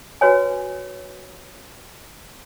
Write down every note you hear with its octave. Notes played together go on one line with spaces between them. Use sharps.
F#4 B4 C#5 G#5